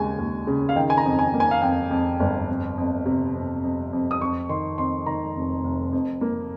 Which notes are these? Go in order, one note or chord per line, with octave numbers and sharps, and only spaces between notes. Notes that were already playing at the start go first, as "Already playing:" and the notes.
Already playing: D#2 C#3 G#3 G#5
D#2
C#3
F5
D#3 G5
G#5
A#5
F2
G#5
A#3
G#5
F5
F2 G5
F2
G1
F2
F2
C3
F2
F2
F2
D#6
F2 C#6
D#3 C6
F2 C6
D#3 A#5
F1
F1
F2
A#3